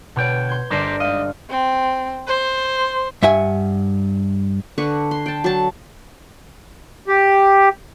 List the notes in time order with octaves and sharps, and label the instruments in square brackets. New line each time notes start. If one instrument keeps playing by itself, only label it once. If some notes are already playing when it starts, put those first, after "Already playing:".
[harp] B2 C#5 [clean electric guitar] D3 G5
[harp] C6 G6 G#6
[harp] G1 D4 D7 [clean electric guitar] G4 A#4 C5
[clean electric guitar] G#2 D#5 [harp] F5
[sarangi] C4
C5
[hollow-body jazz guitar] G2 E5 F#5 G#5
[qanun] D3 D4 B4 C#6
C6
G5 A5
F#3 A5
[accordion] G4